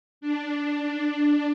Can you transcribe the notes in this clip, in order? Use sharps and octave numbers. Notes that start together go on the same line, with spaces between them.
D4